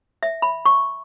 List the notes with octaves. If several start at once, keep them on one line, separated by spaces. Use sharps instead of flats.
E5
B5
C#6